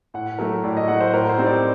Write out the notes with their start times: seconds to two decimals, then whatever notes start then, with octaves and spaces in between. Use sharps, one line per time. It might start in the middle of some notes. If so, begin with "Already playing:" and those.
0.14 A2 F#5
0.39 F#3 A3 A#4
0.64 A2 D5
0.77 D#5
0.88 F#3 A3 F#5
1.01 C5
1.13 A2 A#4
1.29 C5
1.38 G3 C4 D#4
1.46 D5